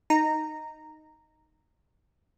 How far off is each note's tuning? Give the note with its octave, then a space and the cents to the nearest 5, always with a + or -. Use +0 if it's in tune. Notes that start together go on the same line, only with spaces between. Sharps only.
D#4 +0 A#5 -10